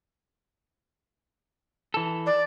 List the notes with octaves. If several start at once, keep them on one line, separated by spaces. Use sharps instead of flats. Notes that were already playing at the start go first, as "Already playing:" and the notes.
E3 A4
D5